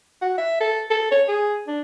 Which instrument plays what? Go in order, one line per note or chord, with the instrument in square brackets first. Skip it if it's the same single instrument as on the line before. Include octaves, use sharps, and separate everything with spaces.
[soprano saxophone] F#4
E5
A4
A4
C#5
G#4
D4